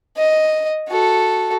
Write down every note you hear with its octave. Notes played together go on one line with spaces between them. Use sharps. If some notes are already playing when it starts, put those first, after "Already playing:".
D#5
F#4 A4